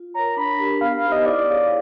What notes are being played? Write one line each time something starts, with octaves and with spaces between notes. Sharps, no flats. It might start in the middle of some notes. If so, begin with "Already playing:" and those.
Already playing: F4
A#4 C#5 A#5
D4 B5
G4 A#4
B3 F5
F5
D#4 G4 C5
D#5
E4 D5
G#4 C#5 F5